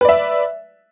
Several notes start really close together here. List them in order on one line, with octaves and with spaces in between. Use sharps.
B4 D5 E5